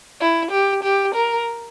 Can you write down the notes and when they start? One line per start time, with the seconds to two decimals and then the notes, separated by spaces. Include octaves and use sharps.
0.21 E4
0.51 G4
0.83 G4
1.14 A#4